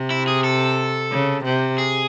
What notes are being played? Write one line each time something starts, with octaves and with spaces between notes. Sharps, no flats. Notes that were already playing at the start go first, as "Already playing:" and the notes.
Already playing: C3
E4
G#4
A4
C#3
C3
G#4